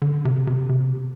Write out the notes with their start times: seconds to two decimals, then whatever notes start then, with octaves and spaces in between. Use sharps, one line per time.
0.02 D3
0.25 C3
0.47 C3
0.69 C3